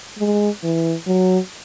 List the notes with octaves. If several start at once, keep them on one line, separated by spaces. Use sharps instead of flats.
G#3
E3
F#3